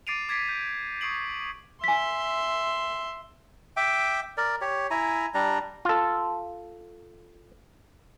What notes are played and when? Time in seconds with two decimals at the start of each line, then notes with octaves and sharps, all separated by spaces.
0.07 D6 A6 C7 D7 D#7 F7
0.29 D6 G#6 A6 B6 C7 D7
0.49 G6
1.01 C#6 D#6 C7 D7 F#7
1.84 E5 G#5 C6 B6
3.77 E5 G5 D6
4.37 A#4 D5
4.61 G4 C#5
4.90 E4 G#5 A#5
5.34 G3 D4 A#5
5.85 F4 A4